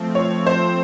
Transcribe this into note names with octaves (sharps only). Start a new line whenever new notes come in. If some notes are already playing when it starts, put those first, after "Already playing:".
Already playing: F3 A3 C4
C#5
C5